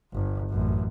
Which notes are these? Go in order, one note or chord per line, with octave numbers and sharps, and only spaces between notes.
G1
A1 F#2